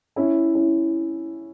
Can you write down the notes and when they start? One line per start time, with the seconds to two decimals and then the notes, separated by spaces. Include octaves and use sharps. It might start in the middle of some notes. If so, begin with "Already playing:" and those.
0.16 C#4 E4
0.55 C#4 E4